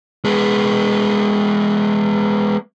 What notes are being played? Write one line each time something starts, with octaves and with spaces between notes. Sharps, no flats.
G#3 B3